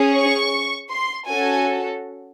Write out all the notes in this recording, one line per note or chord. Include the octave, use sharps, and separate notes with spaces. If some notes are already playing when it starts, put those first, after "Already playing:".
Already playing: C#4 G#4
C#6
C6
C#4 F#4 A4 G#5